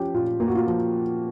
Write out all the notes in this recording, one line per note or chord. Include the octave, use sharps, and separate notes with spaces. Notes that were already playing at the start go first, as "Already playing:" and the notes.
Already playing: F3 C#4 G4
A#2 F4
A#3 F4
F#4
F4
F3